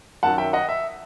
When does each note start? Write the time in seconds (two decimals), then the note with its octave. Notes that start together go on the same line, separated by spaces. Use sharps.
0.23 F#2 D#3 F#3 F#5 A5
0.38 E5 G5
0.53 D#5 F#5
0.69 E5